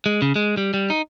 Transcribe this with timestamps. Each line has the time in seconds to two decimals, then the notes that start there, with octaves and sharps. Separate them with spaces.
0.06 G#3
0.22 C#3
0.36 G#3
0.57 G3
0.74 G3
0.90 D#4